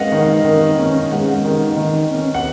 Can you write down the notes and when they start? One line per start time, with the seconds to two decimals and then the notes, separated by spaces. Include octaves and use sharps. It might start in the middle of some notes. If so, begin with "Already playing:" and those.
Already playing: G#3 C#4 D#5 F5 F#5
0.12 D#3
0.45 D#3
0.78 C#4
1.11 G#3 F#5
1.45 D#3
1.77 D#3
2.11 C#4
2.34 F#5